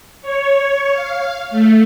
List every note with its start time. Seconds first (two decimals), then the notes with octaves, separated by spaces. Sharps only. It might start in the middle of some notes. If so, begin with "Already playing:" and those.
0.22 C#5
0.93 F5
1.51 A3